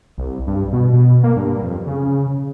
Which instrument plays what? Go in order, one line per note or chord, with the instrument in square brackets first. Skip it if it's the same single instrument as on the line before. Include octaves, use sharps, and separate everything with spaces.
[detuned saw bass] C2
G2
B2
B2
A#3
G2
F2
C#3